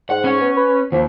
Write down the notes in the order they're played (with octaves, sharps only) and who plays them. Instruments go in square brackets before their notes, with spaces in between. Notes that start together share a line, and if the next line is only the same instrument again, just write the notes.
[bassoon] G#2 [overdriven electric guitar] F#5
[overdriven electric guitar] C#4
[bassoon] B3
B4
[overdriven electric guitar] D#2 [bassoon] F3